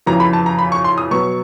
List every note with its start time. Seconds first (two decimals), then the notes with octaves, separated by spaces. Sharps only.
0.06 F2 C#3 E3 A#5
0.20 B5
0.33 A5
0.46 A#5
0.59 B5
0.72 C#6
0.84 C6
0.98 D#6
1.11 B2 F#3 B3 C#6